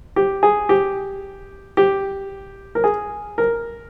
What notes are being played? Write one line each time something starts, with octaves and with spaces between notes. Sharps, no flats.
G4
G#4
G4
G4
A#4
G#4
A#4